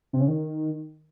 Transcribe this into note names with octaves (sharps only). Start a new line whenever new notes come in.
C3
C#3
D#3